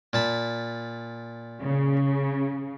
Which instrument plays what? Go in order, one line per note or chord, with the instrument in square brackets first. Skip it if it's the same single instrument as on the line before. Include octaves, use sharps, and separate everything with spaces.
[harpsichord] A#2 A5 B5
[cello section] C#3